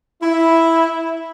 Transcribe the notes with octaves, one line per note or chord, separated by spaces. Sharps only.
E4